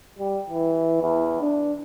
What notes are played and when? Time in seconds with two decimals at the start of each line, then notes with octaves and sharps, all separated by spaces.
0.19 G3
0.49 E3
1.02 E2
1.41 D4